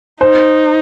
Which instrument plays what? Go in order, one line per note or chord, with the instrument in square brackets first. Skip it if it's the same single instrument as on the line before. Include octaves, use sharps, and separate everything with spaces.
[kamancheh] D#4 [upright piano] C5